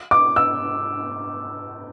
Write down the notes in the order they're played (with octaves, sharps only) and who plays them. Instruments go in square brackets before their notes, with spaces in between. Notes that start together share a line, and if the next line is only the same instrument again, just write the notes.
[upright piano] D6
E6